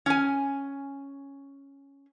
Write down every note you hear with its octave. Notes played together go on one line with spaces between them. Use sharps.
C#4 G#5